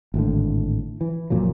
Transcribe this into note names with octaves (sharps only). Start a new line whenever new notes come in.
G#1 A2 D3
E3
F#1 A#2 F3 F#3